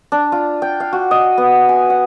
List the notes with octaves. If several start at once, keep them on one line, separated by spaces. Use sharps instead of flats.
D4
F4
G5
F5
F#4
D#5
B3
G#5
F#5